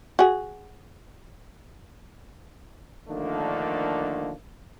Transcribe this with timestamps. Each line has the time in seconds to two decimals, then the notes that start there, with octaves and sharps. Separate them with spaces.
0.19 F#4 G#4
3.08 D3 D#3 F3 A3 A#3 D4